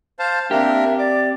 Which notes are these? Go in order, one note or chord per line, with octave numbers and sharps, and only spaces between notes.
C5 F5 A5
A#3 C4 D4 G4 A#4 E5
D5 D6